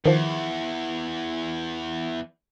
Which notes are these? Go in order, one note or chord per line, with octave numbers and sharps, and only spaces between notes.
E2 D#3 F3